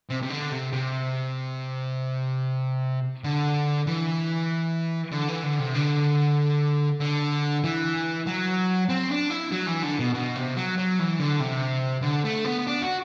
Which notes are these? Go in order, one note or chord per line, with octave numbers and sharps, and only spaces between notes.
C3
C3
D3
C3
C3
D3
E3
D3
E3
D3
C3
D3
D3
E3
F#3
C4
D4
E4
F#3
E3
D3
B2
B2
C3
F#3
F#3
E3
D3
C3
D3
A3
B3
D4
F#4